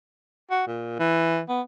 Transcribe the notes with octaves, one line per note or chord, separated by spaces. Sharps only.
F#4
A#2
E3
B3